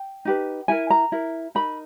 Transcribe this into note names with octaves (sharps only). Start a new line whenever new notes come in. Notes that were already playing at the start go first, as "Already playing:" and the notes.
Already playing: G5
D#4 G4 B4
E4 A#4 G#5
A#5
E4 A#4
D#4 A#4 B5